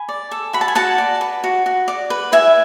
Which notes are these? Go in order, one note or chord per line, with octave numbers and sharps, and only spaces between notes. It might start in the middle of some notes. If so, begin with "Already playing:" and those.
Already playing: G#5 B5
D5
A4
F#4 B5
A5
G#5
F#4 F#5 A5
D5
B4
F#4
F#4
D5
B4
E4 E5 G#5